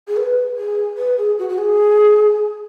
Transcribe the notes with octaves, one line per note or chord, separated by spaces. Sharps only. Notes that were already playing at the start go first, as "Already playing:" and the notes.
G#4
B4
G#4
B4
G#4
F#4
F#4
G#4